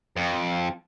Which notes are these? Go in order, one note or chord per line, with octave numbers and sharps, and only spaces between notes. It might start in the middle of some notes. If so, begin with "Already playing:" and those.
F2